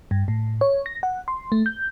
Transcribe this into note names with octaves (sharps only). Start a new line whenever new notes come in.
G2
A2
C#5
A#6
F#5
C6
A3
G6